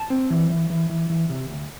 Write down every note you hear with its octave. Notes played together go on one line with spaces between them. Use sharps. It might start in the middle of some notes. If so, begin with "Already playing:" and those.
Already playing: A5
C4
E3
E3
E3
E3
E3
C3
D2